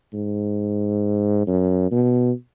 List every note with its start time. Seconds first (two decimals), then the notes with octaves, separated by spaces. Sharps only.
0.14 G#2
1.47 F#2
1.91 B2